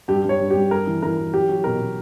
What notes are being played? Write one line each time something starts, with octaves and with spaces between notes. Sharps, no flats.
G2 G4
G2 C#5
G2
G4
G3
G2 A#4
E3
E3 A#4
E3
F#3 G4
F#3
B2 A#4
B2